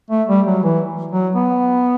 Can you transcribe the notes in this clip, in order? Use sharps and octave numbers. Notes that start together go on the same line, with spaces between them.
A3
G3
F#3
E3
F#3
B3